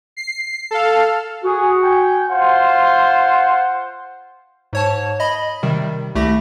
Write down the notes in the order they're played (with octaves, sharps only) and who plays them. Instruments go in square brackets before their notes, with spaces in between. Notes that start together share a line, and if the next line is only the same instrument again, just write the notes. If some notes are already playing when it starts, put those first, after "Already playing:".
[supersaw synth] C7
A4 F5
[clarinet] F#4 [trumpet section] G#4
[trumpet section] G5 G#5
[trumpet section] F4 C5 [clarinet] F#5
[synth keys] G#2 C#5 A5
D#5 B5
C3 D#3 G3
C2 A3 G4 B5 A#6